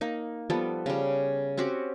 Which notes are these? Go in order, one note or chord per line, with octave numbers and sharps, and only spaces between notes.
A#3 D#4
F3 G3 B3 A4
C#3 G3
C4 C#4 F#4 G4